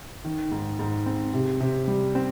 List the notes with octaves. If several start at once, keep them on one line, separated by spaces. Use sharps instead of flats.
D#3
G#2
G#2
C4
C3
C3
G3
C4